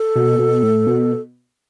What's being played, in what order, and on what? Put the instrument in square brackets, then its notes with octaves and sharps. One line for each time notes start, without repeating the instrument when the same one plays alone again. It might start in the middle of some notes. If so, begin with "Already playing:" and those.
Already playing: [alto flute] A4
[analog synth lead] B2
B2
A2
B2